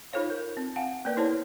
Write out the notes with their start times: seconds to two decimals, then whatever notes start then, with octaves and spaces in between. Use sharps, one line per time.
0.13 D#4 F4 A4 C5 C#5 F5
0.30 A#4
0.57 C4
0.76 F5 F#5 G#5 A5
1.05 A#3 B3 A#4 B4 D5
1.17 E4 G#4 C5 C#5 A5 C6